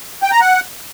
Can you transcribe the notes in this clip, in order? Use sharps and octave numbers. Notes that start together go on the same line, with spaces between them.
G5
A#5
F#5